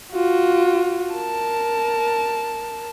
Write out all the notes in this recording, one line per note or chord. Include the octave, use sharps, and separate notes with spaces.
F4 F#4
A#4 A5